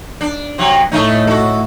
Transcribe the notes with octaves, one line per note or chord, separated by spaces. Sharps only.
D4
C3 F#3
A2 A3 C#4 D#4
F#4 A4